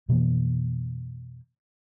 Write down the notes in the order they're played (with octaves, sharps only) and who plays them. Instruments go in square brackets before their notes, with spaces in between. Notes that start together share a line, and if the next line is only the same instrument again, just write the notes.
[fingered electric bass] F2 B2 E3 A#3